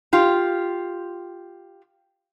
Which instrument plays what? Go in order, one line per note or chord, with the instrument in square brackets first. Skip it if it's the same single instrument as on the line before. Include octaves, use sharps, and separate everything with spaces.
[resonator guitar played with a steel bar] F4 G4